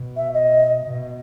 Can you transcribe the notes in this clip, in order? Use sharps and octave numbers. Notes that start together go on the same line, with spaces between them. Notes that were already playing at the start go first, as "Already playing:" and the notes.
Already playing: B2
E5
D#5
B2